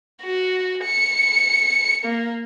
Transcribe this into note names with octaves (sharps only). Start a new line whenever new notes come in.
F#4
C#7
A#3